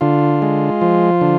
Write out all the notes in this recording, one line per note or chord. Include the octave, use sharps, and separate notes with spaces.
D3 F4
G#3
F3
D3